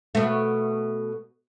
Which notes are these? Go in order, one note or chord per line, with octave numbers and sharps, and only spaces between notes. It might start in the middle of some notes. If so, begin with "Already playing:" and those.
B2 A3